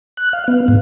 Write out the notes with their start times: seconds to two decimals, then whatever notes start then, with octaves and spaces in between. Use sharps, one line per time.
0.17 F#6
0.33 F5
0.48 B3
0.68 G#2